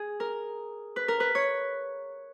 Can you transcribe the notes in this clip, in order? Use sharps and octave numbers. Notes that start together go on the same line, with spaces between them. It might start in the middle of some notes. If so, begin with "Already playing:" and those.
Already playing: G#4
A#4
B4
A#4
B4
C#5